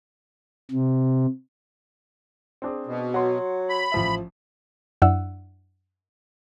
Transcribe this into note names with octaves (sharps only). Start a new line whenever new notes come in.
C3
C4 D4 G#4
B2
F#3 F#5 C6
B5
A1 F3 E5
F#2 D4 E4 F#5 E6